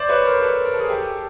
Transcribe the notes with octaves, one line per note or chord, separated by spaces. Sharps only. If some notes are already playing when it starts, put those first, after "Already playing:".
Already playing: C5 D5
B4 C#5
A#4 C5
A4 B4
A#4
A4
G#4 A#4
G4 A4